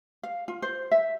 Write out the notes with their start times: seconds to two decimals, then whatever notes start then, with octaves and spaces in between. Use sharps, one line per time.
0.23 F5
0.48 F4
0.62 C5
0.91 E5